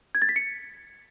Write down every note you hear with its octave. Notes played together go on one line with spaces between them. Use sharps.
G#6
A6
B6
C#7